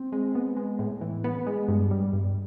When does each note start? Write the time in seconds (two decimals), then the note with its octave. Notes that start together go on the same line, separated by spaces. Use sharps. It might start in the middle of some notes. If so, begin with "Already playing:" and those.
Already playing: C4
0.12 G#3
0.35 B3
0.57 G#3
0.79 A2
1.01 E3
1.24 B3
1.47 G#3
1.68 G2
1.91 G3
2.13 G2